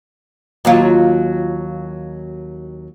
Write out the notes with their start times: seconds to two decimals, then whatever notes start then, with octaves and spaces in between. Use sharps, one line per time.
0.65 D#2 F#3 F4